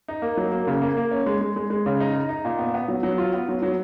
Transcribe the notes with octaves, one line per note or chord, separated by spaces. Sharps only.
D#4
A#3
F#3
A#3
C#3
A#3
A#3
C#4
G#3
G#3
G#3
G#3
C#3
D#4
D#4
D#4
A#2
B3
B3
F#3
F#3
F4
B3
F#3
F#3